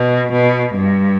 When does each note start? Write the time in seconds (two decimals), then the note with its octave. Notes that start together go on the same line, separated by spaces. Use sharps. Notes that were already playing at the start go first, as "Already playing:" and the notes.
Already playing: B2
0.32 B2
0.75 G2